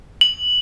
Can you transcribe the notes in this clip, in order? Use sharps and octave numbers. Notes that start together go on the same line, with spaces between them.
F#7